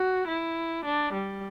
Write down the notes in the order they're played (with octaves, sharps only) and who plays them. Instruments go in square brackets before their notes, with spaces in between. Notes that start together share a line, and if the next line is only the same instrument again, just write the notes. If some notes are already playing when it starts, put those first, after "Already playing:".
Already playing: [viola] F#4
E4
D4
G3